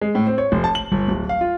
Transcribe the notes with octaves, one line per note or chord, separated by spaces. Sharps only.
G#3
A2
C4
C#5
F1
A5
F#7
G1
D1
F5
F4